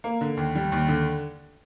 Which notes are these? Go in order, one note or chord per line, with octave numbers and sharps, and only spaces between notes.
A#3
D3
D#2
G3
D#2
D3